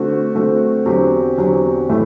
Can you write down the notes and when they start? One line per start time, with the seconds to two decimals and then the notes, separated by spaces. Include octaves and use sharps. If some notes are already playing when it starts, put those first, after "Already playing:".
Already playing: D3 A3 C4 F#4
0.35 D3 A3 C4 F#4
0.86 E2 D3 F#3 C4 G4
1.38 E2 D3 F#3 C4 G4
1.89 A2 E3 A3